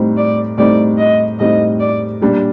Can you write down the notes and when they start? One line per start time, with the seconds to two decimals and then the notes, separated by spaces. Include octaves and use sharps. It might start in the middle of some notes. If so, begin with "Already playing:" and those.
Already playing: A2 G3 C4 D#4
0.17 D5
0.58 A2 G3 C4 D#4 D5
0.98 D#5
1.39 A2 G3 C4 D#4 D#5
1.80 D5
2.21 A#2 G3 D4